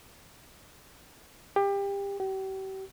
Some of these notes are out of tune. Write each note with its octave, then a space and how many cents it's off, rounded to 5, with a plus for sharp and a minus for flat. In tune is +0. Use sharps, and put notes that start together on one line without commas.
G4 +25
G4 -40